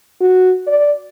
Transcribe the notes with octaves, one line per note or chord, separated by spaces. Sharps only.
F#4
D5